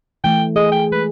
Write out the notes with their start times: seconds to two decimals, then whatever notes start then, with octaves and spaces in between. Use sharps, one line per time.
0.24 E3 A3 G5
0.56 G#4 D#5
0.72 G5
0.92 G#3 B4